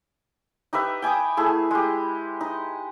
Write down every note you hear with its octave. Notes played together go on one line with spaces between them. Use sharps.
D#4 G4 B4 E5
G5 G#5 D6 D#6
A3 E4 G#4
G#3 G4
D#4